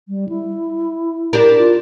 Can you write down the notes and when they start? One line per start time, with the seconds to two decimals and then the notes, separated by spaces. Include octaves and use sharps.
0.08 G3
0.29 E4
1.33 D4 G4 A#4
1.57 F4